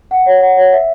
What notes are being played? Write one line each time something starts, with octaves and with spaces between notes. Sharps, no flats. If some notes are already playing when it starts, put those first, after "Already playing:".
F#5
C#5
F#5
C#5
E5